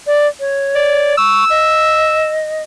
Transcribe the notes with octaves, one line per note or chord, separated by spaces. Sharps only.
D5
C#5
D5
C#6 E6
D#5